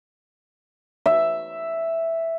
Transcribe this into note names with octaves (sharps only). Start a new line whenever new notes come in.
E5